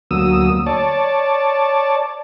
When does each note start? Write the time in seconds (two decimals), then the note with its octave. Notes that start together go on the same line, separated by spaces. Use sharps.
0.11 D2 F#3 A#3 D#6 E6
0.66 C#5 D5 A5